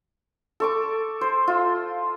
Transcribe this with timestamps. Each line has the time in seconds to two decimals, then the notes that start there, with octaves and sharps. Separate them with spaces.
0.60 A4 C#6 D6
1.21 C5
1.48 F4